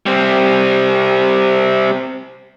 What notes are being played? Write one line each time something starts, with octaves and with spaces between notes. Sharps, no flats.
G3 C4